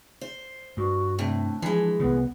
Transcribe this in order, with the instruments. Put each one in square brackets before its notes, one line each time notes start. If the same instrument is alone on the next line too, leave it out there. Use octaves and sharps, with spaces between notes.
[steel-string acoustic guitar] C5
[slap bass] G2 [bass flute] F#4
[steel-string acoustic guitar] A2 C3 [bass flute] D4
[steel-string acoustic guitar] E3 G#3 [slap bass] F3
[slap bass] C2 C#3 [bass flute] B3